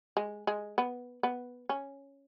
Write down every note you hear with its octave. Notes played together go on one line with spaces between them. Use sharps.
G#3
G#3
B3
B3
C#4